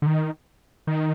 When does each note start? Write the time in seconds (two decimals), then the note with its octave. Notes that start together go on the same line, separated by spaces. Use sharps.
0.02 D3
0.06 D#3
0.87 D#3